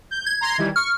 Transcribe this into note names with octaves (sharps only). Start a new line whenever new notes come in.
G6
G#6
A#5 C6
D#3 E3 G3
C#6 F6